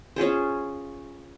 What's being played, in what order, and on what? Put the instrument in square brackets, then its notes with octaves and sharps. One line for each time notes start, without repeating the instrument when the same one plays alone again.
[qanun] C#4 F4 G#4 C5